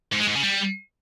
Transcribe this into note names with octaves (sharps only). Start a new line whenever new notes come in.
G#2
G#3
G#2
C#3
G3